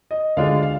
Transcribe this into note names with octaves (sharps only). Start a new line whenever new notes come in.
D#5
D2 D3 G#3 D4 F4 F5
F5